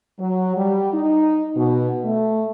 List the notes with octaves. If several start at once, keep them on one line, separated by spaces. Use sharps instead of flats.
F#3
G3
D#4
B2
A3